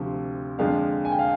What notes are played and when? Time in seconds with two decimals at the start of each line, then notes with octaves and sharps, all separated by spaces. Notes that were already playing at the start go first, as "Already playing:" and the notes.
Already playing: D2 C3 F3
0.59 F2 D3 F3 G#3 D4 F5
1.05 G#5
1.12 G5
1.19 F5